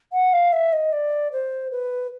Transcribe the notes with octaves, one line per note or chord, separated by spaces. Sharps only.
F#5
F5
E5
D#5
D5
C5
B4